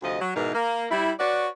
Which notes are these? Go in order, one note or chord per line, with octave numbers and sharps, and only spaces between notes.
D2 C3 F3 D#5
F#3
G#2 B2 E3 D#4 A#4
A#3
G3 E4
F#4 B4 C#5 D5